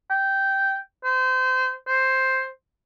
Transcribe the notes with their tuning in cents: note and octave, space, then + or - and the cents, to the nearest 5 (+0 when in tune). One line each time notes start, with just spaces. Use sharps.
G5 -10
C5 -25
C5 +5